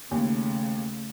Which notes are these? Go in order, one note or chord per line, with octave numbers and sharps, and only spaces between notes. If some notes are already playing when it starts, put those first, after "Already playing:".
D#2 C#3 A3